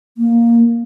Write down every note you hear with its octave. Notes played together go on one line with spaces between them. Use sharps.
A#3